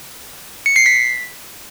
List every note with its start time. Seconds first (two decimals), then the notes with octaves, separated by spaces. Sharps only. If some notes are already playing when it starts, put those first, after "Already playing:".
0.66 C#7
0.76 C7
0.86 B6